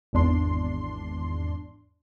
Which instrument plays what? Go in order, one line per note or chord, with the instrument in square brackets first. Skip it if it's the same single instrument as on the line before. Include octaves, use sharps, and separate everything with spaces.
[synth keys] G#1 E2 D4 C6